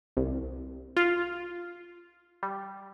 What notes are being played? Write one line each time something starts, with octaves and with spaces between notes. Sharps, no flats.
C2
F4
G3